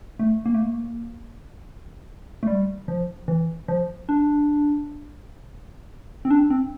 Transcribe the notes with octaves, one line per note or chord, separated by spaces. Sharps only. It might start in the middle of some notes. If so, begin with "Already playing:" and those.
A3
A#3
A3
A#3
A3
G3
F3
E3
F3
D4
C4
D4
C4